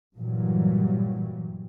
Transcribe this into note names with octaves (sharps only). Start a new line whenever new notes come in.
G2 A#2 E3 F#3 G3